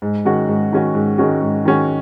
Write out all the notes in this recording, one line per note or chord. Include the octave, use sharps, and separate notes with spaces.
G#2
D#3 G#3 C#4 F#4
G#2
D#3 G#3 C#4 F#4
G#2
D#3 G#3 C#4 F#4
G#2
D#3 G#3 C#4 F#4